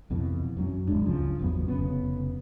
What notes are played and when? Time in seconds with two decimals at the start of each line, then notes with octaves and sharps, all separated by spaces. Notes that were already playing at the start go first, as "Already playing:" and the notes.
0.10 C2 F2 B2 E3
0.57 F#2 F#3 C#4
0.88 D1 E2 G#3 D4
1.06 C#2 F#2 C#3 F3
1.39 G#1 E2 F#3 B3
1.67 F1 C#3 B3 C#4